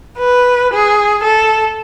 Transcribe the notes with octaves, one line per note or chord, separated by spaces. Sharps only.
B4
G#4
A4